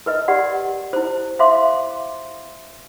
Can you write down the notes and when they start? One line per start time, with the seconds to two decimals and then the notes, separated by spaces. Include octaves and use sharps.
0.06 A#4 B4 D#5
0.28 G4 D5 F#5
0.93 E4 C5
1.39 C5 E5 F5 C6 D6